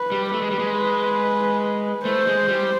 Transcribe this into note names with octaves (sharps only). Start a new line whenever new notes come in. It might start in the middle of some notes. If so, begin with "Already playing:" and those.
Already playing: B4
G3
A3 B4
G#3
G3
G#3
A3 C5
G#3
G3